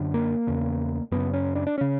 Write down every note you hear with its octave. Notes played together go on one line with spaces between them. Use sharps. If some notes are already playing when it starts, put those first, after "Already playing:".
Already playing: F#2 D3
A#3
E2 C#3
F#2 C#3 B3
C#4
D4
D4
C#3 C#4